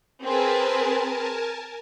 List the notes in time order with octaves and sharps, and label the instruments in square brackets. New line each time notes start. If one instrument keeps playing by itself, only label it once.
[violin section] C4 G#4 B4 [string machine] A#4 G#5 A5